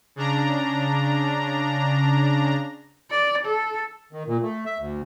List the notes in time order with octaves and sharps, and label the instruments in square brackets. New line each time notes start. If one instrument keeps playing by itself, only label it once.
[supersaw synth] C#3 D4 A#5
[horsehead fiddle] D5
A4
[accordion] D#3
A#2
A3
E5
D2